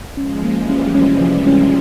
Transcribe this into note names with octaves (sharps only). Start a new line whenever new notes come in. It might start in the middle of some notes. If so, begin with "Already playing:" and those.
F3 G#3 C#4
A#3
E3 G3
C#4
C3 E3 C#4
F3
C#4